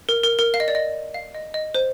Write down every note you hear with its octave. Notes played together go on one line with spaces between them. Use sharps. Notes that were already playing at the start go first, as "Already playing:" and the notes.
A#4
A#4
A#4
F5
D#5
D5
D#5
F5
D#5
D#5
C5